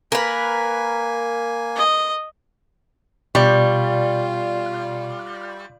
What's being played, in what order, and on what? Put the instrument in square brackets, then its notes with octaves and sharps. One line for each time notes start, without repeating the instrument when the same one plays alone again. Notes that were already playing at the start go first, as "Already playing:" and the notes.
[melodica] A#3 G#5 [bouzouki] A#4 B4
[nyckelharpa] D#5
[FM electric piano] B2 [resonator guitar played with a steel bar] G3 [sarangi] F4 [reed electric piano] D5 C#6